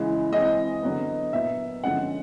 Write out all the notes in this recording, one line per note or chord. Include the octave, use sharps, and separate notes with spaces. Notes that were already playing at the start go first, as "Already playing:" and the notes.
Already playing: C#3 E3 G#3
E3 G#3 C4 D#5
D3 F#3 B3
A#2 F#3 B3 E5
D3 F3 G#3 C#4 F#5